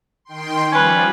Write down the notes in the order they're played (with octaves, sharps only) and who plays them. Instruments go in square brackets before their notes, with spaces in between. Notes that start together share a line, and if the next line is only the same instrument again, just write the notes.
[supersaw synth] D#3 G5 C6
[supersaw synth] F3 G3 [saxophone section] C#4 B4